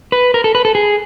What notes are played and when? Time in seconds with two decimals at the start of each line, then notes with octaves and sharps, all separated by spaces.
0.12 B4
0.34 A#4
0.44 A4
0.55 B4
0.65 A4
0.75 G#4